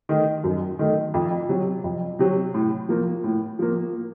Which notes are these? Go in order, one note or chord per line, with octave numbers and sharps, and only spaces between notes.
D#3 A3
F#2
D#3 A3
F2
C3 F#3
F2
C3 F#3
A2
F3 A#3
A2
F3 A#3